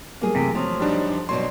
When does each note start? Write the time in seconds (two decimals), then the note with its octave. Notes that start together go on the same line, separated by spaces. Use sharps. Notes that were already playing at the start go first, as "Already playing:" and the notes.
0.21 F#3 G3 A#3 B3 G#4
0.35 F#2 C3 E3 A3
0.55 F3 F#3
0.80 G3 D4 D#4
1.29 G2 B2 F#3 C6